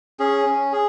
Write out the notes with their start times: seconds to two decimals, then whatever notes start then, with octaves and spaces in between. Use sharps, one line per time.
0.19 C#4 G#4
0.46 C#4
0.72 G#4